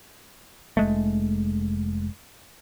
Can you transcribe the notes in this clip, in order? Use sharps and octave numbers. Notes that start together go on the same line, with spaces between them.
F1 G#3 A3